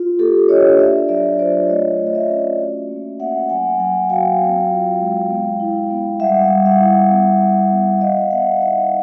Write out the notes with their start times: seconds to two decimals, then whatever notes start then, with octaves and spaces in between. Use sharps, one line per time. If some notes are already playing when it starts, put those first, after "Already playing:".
Already playing: F4
0.19 A#3 G4 A4
0.49 D4 C#5 D#5
0.79 D4 D5 E5
1.09 F#3 D5 E5
1.39 F4 C5 D5
1.69 A3 C#5 D#5
2.00 A3
2.07 D#5
2.15 D5 E5
2.29 C#4
2.59 F#4
2.89 A#3
3.20 A#3 E5 F#5
3.49 F#3 F#5 G#5
3.79 F#3 F#5 G#5
4.09 F#4 F5 G5
4.39 C4
4.69 F4
5.00 G#3
5.30 B3
5.60 E4
5.91 B3
6.20 G3 E5 F#5
6.51 G3
6.66 E5 F#5
6.80 E4
7.11 B3
7.41 B3
7.71 B3
8.01 B3 D#5 F5
8.31 B3 E5 F#5
8.61 D#4 E5 F#5